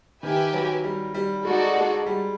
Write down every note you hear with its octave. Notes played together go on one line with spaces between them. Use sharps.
D#3 G4 B4 E5 G#5
F#3
G3
G3
G#3 D#4 F#4 A4 D5
G#3
G3